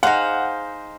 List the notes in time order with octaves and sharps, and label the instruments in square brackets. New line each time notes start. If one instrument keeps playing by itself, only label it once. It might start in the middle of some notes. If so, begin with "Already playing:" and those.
[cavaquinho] D#4 G#4 C5 F5 [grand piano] F#5